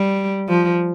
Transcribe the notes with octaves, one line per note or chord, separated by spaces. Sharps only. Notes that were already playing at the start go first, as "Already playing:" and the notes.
Already playing: G3
F3